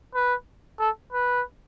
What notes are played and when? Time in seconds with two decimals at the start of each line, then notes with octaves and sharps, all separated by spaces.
0.15 B4
0.80 A4
1.13 B4